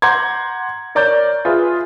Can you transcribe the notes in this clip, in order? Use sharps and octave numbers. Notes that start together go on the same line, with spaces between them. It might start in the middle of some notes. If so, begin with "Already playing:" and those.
F#5 A#5 C6 D6 G6 G#6
A#4 C#5 D5 A#5 D6 G6
F4 G#4 B4 E5